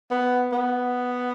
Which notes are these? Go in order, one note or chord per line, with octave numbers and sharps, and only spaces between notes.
B3
B3